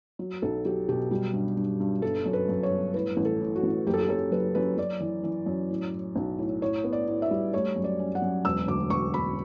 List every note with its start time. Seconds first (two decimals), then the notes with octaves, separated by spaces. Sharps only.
0.19 F#3
0.42 B1 A4
0.65 F#3 G4
0.89 B2 G4
1.11 G3
1.33 G2
1.57 G2
1.80 G2
2.02 G1 A4
2.26 F#2
2.33 B4
2.49 F#2
2.63 C#5
2.71 G1
2.94 A2 B4
3.17 A1
3.25 A4
3.41 A2
3.56 F#4
3.63 A1
3.87 F#1 G4
3.94 A4
4.01 G4
4.09 F#2 A4
4.32 F#1 B4
4.55 F#2 B4
4.77 F#2 D5
5.00 E3
5.24 E3
5.46 F#2
5.70 A2
5.92 A2
6.16 B1
6.38 A2
6.62 A2 C#5
6.84 B3
6.93 D5
7.08 A2
7.22 E5
7.31 G3
7.53 A3 C#5
7.76 F#2
7.84 D5
7.99 C#4
8.15 F#5
8.22 F#2
8.45 E1 E6
8.68 D2 D6
8.90 E1 C#6
9.14 E1 B5